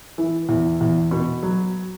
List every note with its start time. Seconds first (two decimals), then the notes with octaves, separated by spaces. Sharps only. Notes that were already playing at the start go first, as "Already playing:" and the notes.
0.18 E3
0.49 E2
0.81 E2
1.11 B2
1.43 F#3